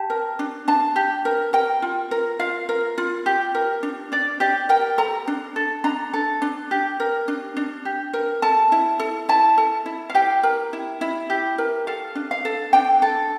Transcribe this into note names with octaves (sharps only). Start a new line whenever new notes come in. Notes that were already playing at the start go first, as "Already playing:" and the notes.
Already playing: G4 A5
A#4
D4
D4 A5
G4
A#4
A#4 G5
F4
A#4
F4 F5
A#4
F4
G4
A#4
D4
D4 D5
G4 D5
A#4 G5
A4 A#5
D4
A4
D4 A#5
A4
D4
G4
A#4
D4
D4
G4
A#4
A4 A5
E4
A4
E4 A5
A4
E4
F5
G4 G5
A#4
E4
E4
G4
A#4
A4 F5
D4
F5
A4
D4 G5
A4